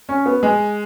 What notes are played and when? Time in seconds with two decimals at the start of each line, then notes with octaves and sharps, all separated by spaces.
0.09 C#4
0.26 B3
0.43 G#3